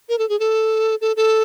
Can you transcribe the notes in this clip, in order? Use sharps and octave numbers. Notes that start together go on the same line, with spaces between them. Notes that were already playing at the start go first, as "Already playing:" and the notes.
A#4
A4
G#4
A4
A4
A4